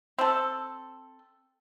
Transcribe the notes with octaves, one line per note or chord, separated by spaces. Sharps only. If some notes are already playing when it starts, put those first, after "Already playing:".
C4 A4